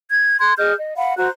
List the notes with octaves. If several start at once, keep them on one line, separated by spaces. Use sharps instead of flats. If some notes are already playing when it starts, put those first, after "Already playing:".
G#6
C6 F#6 G#6
G#4 D#5 F6 G6
D#5
F5 F#5 B5
F#4 C5 A#5 F#6